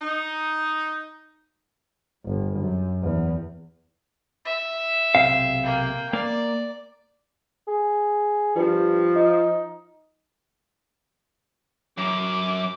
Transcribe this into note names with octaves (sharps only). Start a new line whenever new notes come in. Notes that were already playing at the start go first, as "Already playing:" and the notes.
D#4
G1
F#2
E2
E5
B1 C3 F5
A#3 G5
A#3 D5
G#4
G2 F3
D#4
F#2 D6